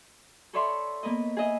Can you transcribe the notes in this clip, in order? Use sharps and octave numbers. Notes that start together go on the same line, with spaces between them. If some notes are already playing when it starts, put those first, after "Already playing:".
A4 B4 C#5 D5 E5 C6
A#3 B3 A#4 B4 D#5
G#4 B4 D#5 E5